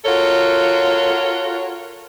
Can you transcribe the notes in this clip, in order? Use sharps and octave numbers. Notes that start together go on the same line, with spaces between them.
F4 F#4 A4 A#4 C#5